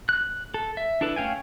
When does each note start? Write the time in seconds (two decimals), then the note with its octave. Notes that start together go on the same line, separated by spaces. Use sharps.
0.09 F#6
0.54 A4
0.77 E5
1.01 D4 E4 A4 B4
1.16 A3 C#4 F5 G5 G#5